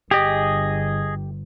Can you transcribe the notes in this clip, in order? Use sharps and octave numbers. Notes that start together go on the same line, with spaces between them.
G1 G4 G#4 D#5